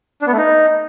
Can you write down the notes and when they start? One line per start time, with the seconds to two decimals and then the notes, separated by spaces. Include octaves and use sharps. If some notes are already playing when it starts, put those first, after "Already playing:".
0.22 D4
0.27 B3
0.32 A3
0.37 D#4